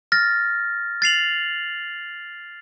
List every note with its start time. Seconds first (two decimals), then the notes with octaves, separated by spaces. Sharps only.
0.12 F6 A6 A#6
1.02 A6 C7 F7 F#7